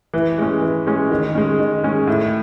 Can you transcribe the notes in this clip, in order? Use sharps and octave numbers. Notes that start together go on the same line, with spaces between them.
E3
G#3 C#4
E3
G#3 C#4
D#3
G#3 C#4
D#3
G#3 C#4
A2